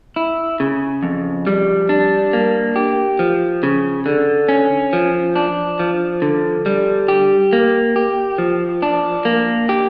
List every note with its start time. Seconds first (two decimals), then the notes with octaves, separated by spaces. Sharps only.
0.16 E4
0.60 C#3
1.03 F2
1.47 G3
1.89 D4
2.33 A#3
2.76 G4
3.19 F3
3.63 C#3
4.06 D3
4.49 C#4
4.93 F3
5.36 D4
5.79 F3
6.22 D3
6.66 G3
7.08 G4
7.53 A#3
7.96 G4
8.38 F3
8.82 D4
9.25 A#3
9.69 G4